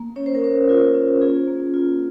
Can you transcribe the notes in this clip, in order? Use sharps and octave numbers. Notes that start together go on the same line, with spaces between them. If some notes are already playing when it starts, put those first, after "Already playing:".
Already playing: A#3
C#4 C#5
C5
A#4
C#4 C5
F4 A#4
C#4
F4 G#4
A#3
F4